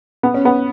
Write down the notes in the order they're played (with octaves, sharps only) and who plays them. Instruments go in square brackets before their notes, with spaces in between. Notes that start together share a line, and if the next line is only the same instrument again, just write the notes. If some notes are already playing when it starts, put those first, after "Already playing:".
[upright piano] B3
C#4
B3